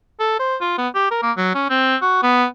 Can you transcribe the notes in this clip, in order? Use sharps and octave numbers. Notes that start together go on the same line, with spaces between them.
A4
C5
F4
B3
G4
A#4
A#3
F#3
C#4
C4
F#4
B3